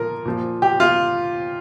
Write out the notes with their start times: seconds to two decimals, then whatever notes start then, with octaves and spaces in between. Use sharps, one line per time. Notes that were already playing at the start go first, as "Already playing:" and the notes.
Already playing: A#2 F3 A#4
0.25 A#2 F3
0.62 G4
0.80 F4